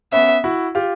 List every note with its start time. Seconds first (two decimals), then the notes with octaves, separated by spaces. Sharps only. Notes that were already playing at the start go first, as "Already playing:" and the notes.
0.12 B3 C#4 E5
0.44 E4 F#4
0.75 F4 G4